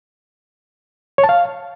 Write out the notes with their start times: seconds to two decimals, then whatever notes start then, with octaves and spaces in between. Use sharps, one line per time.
1.18 C#5
1.24 A5
1.29 F5